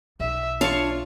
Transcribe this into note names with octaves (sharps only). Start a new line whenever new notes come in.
B1 E5
D4 F4 C#5 F5 A5 C#6